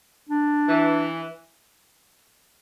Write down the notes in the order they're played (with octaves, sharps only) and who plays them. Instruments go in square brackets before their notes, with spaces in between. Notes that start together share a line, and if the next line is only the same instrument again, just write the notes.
[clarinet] D4
[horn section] E3